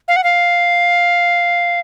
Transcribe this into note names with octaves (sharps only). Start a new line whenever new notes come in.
F5
F#5
F5